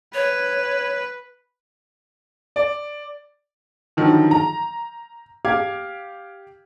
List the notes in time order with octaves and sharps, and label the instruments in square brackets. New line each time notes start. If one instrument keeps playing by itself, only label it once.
[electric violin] B4 [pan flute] C#5
[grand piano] D5
[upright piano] D3 D#3 F3 F#3
A#5
G4 F5 D6 G#6